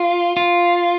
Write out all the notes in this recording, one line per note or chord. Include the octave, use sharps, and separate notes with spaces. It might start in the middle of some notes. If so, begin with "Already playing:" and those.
Already playing: F4
F4